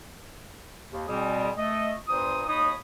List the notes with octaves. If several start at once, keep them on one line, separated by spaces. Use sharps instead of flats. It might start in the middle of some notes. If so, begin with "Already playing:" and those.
D#2
B2 G3 C4 G#4
A3 D#5
E2 G2 A#2 C5 D#6
D#2 D#4 C#5 B5 D#6